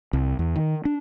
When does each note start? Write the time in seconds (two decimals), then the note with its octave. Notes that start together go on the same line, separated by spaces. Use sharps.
0.13 C2
0.39 E2
0.56 D#3
0.85 D4